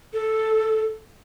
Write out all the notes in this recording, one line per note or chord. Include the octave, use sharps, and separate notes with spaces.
A4